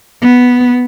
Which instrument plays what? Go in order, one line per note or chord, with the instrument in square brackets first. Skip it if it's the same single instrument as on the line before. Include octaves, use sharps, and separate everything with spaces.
[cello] B3